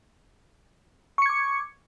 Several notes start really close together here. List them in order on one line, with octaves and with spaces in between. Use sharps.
C#6 C#7 G#6 D6